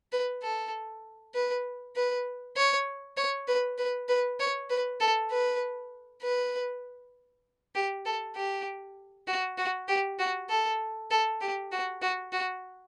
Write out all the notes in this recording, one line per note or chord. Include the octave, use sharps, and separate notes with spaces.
B4
A4
B4
B4
C#5
C#5
B4
B4
B4
C#5
B4
A4
B4
B4
G4
A4
G4
F#4
F#4
G4
F#4
A4
A4
G4
F#4
F#4
F#4